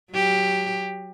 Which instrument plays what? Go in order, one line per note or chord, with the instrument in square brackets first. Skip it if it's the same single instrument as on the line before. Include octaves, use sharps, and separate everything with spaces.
[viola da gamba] F#3 G4